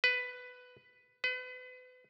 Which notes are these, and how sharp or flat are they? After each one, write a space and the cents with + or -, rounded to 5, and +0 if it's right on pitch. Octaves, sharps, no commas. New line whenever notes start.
B4 +10
B4 +35